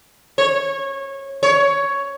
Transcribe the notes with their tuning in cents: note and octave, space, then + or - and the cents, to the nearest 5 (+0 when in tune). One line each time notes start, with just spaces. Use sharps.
C#5 -20
C#5 +10